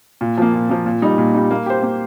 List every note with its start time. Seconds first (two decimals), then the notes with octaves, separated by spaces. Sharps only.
0.21 A#2
0.38 F3 A#3
0.54 A#2
0.70 F3 A#3
0.86 A#2
1.02 G3 D#4
1.18 A#2
1.34 G3 D#4
1.51 A#3
1.66 G4 C5
1.83 A#3